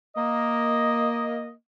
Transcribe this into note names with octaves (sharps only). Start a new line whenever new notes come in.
A#3 D#5